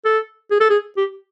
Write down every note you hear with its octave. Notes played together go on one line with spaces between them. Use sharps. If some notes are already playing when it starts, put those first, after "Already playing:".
A4
G#4
A4
G#4
G4